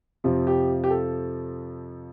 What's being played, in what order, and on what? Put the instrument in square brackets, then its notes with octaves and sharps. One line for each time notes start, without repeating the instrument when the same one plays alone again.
[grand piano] F2 C3 F3
G4
G4
A4